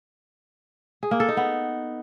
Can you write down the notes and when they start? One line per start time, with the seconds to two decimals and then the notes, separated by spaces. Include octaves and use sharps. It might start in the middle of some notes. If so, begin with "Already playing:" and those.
1.03 G#4
1.11 A#3
1.20 A4
1.29 D#4
1.37 B3